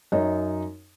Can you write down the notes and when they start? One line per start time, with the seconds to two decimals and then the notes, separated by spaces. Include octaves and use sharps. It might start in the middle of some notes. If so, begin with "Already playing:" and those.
0.12 F#2 D#4 C#5